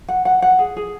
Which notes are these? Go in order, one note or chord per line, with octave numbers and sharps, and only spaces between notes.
F#5
F#5
F#5
G#4
G#4